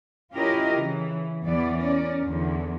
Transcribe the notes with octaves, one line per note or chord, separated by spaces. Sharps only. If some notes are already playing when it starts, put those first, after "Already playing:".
C#4 E4 F4 G4 A#4 D#5
C#3 E3
E2 E3 B3 D5
C#4 A#4 D5
E2 D3